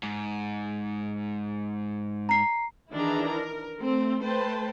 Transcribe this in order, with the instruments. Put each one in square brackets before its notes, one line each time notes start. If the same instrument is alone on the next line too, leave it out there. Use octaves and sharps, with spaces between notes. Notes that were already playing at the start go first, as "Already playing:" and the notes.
[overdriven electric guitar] G#2
[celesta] A#5 C7
[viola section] D#3 E3 D4 E4 G#4 A#5
A#4
A3 C4
A3 B4 C5 G5 A5